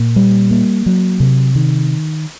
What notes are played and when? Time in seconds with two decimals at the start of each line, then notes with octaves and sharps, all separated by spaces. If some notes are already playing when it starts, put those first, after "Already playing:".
Already playing: A#2 A#3
0.16 G3
0.51 A#3
0.86 F#3
1.20 C3
1.55 D#3